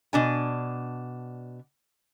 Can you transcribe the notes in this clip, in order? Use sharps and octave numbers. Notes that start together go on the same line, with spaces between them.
B2 D4 G#5